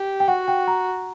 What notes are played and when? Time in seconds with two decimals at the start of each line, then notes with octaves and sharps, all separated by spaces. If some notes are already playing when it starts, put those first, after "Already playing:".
Already playing: G4
0.20 G5
0.28 F#4 F#5
0.48 G5
0.68 A#5